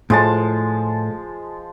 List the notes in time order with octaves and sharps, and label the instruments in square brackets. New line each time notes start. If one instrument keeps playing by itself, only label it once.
[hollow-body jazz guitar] A2 [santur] F3 G#3 A5